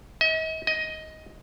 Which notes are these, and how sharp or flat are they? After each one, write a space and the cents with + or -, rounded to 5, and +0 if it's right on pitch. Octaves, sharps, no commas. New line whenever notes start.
D#5 +45
D#5 +15